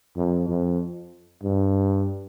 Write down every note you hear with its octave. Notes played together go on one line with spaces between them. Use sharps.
F2
F2
G2